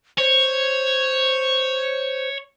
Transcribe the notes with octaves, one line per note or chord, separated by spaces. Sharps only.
C5 C#5